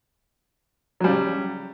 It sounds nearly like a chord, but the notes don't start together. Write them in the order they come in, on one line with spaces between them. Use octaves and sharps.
F#3 G3 C#3